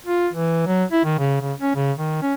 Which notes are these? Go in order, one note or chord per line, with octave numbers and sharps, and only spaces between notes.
F4
E3
F#3
E4
D#3
C#3
C#3
C#4
C#3
D#3
C#4